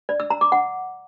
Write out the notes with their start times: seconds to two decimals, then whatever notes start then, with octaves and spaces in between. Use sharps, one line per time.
0.09 D5
0.20 E6
0.30 A#5
0.41 D6
0.52 F#5